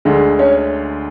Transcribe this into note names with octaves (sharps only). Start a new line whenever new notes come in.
D2 D3 G#3
C#4 C#5